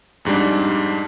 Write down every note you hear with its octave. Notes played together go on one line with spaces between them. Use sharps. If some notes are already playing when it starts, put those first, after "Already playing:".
F2 G#2 G3 D4